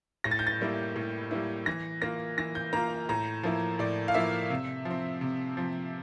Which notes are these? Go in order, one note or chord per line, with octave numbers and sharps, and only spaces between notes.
A2 A#6
A6
G6
A6
G3 A#3 E4
A2
G3 A#3 E4
E3 A#6
A#3 F4 A#6
E3 A#6
G6
A#3 F4 A#5
A2 A#5
F3 A#3 E4
A2 D5
F5
F3 A#3 E4 E5
C3
F3
C4
C3
F3 C4